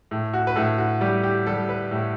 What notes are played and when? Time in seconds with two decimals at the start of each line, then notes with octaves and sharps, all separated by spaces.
0.11 A2
0.33 F#4
0.47 B4
0.56 A2 A4
0.78 F#4
1.01 G3 G4
1.23 G4
1.47 G3 A4
1.69 B4
1.91 A2